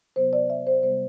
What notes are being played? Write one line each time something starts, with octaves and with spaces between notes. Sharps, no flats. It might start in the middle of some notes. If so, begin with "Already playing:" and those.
C3 F#3 B3 C5
D5
E5
C5
C3 G3 B3 C5